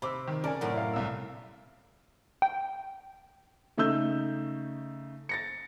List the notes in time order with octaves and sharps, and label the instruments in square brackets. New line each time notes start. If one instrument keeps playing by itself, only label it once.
[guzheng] C3 [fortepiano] B5 D6 E6
[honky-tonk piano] D#3
[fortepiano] C#3 G#5 [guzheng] A4 [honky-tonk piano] A#4 D5
[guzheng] F#2 A2 [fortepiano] F#5
[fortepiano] E4 F5
[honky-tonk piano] C2 E6
[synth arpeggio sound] G5
[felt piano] C#3 A3 D#4 E6 G6
A6 A#6 C#7